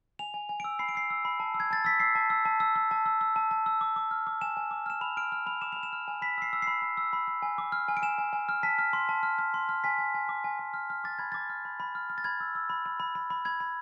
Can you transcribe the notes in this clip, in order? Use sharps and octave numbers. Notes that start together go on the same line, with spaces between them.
G#5 F7
G#5
G#5
E6 D7
B5 C7
D7
E6 C7
E6
B5
A5
E6
G#6
A5 A6
E6 B6
E6 C7
A5
E6
A5
E6
E6
A5
E6
E6
A5
A5
E6
D6
D6
F6
D6
G#5 E7
G#5
D6
F6 E7
B5 F7
F6 D7
F6
B5 F7
D6 E7
B5 F7
E7
F6
G#5
B5 B6
E6 C7
E6
C7
B5
B5
E6
B5
B5
G#5
D6
F6
G#5
D7
G#5 E7
G#5
G#5
F6
A5 B6
F6
C6
A5
F6
F6
C6
F6
G#5 B6
G#5
G#5
D6
G#5
G#5
F6
F6
D6 A6
B5 G#6
D6 A6
F6
B5
B5
F6
F6
A6
B5 G#6
E6
E6
B5
B5
B5
B5
B5
B5 G#6
B5